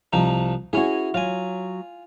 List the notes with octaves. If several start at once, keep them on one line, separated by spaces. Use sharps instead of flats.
C2 F3 D#4
C#4 E4 F#4 G#4
F#3 F4 G#5